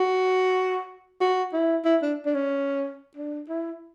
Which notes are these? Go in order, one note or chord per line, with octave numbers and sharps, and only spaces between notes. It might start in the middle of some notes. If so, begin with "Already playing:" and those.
Already playing: F#4
F#4
E4
E4
D4
D4
C#4
D4
E4